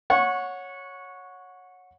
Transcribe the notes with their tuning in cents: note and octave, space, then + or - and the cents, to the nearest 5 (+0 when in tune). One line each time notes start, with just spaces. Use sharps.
C#5 +0 F#5 -20 C#6 -20